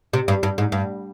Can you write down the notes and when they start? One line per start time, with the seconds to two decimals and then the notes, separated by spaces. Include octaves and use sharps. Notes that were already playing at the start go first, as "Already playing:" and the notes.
0.13 C3
0.28 G2
0.43 G2
0.58 G#2
0.72 G2